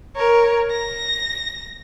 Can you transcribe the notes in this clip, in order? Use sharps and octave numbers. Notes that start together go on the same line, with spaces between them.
A#4 C#5
A#6